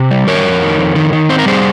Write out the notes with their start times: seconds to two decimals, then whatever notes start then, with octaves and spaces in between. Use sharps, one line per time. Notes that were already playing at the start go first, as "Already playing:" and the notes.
Already playing: C3 C5
0.11 G3
0.27 D#3 A#4 C#5
0.45 F2
0.62 D#3
0.78 F2
0.95 D#3
1.13 D#3
1.29 C4 C5
1.39 A#4
1.46 G3 G#4 C5